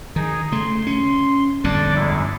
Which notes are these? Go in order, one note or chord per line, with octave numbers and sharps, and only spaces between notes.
D#3 D#4 G#4
C#3 A3 C6
C#4
G1 F2 A2 D4 D5 D6
F#2 G#3 E4